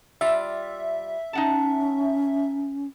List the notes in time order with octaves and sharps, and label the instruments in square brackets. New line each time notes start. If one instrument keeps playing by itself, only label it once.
[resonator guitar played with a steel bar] G3 F4 [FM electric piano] E5
[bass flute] C#4 [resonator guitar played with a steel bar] D#4 F#5 A5